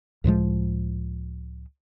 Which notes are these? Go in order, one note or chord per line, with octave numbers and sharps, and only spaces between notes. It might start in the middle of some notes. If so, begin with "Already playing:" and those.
C#2 A2 F3 G#3